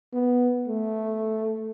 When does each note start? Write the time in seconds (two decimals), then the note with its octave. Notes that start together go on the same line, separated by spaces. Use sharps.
0.13 B3
0.68 A3